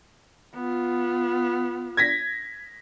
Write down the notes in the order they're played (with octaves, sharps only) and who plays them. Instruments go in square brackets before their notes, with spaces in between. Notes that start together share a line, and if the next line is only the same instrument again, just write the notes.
[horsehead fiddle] B3 F4
[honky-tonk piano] G#6 A#6 B6